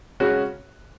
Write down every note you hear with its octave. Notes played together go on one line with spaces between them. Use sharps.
C#3 G#3 C#4 F#4